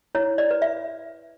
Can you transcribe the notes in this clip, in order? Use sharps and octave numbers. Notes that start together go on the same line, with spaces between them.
E4 C#5
D5
B4
E5